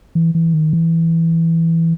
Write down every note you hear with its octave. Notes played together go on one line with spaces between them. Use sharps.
E3
E3
D#3
E3